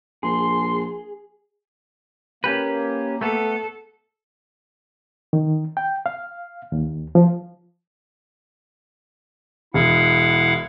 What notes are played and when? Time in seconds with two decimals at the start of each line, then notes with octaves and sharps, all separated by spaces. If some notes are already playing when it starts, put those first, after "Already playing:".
0.23 A#1 G#4 C6
2.44 A#3 C#4 G4 B4
3.21 A3 B3 A4
5.33 D#3
5.77 G5
6.06 F5
6.72 D#2
7.15 F3
9.74 E1 E4 F5 F#5